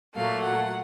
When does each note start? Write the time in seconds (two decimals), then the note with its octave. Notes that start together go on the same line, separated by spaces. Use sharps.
0.15 A#2 F#3 A3 F5
0.43 F#5